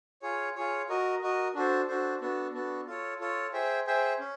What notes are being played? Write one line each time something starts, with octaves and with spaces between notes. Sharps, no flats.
F4 G#4 C#5
F4 G#4 C#5
F#4 A#4 D#5
F#4 A#4 D#5
D4 F#4 A4 C5
D4 F#4 A4 C5
B3 D4 F#4 A4
B3 D4 F#4 A4
F4 A4 C#5
F4 A4 C#5
G#4 C5 E5 G5
G#4 C5 E5 G5
C#4